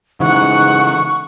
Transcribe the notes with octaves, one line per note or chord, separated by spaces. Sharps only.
G#2 C#3 E3 F#5 C#6